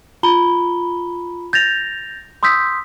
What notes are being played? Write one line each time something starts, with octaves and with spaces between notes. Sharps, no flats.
F4 A#5 B5 G7
G6 A6 A#6 F7
C6 D#6 E6 G6 B6